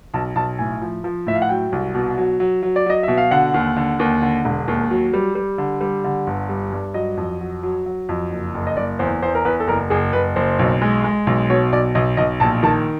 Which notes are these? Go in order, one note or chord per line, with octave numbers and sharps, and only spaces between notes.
B1 A5
B1 A5
A2 G#5
F3
F3
A2 E5
F5
F#5
F#3 G5
C2
B2
F#3
F#3
F#3
D5
F#3 D#5
B2 E5
F5
D3 F#5
D#2
D3
D#2
D3
E1
D#2
F#3
G3
G3
D3
G3
D3
G1
G3
G2
F#3 D#5
F2
F#3
F#3
F#3
F2
F#1
F#1
D#5
F#1 D5
E2 C5
E2 C5
A#4
E2 B4
A4
F#1 A#4
F#1 G#4
F#1 B4
F#1 C5
B1
G#3
G#3
B1
B2 C#5
B1 D5
B1 D#5
B1 D#5
A#1 A5
D#3 A5